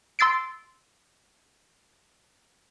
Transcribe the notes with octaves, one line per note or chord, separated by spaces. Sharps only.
C6 E6 A6 C7 D7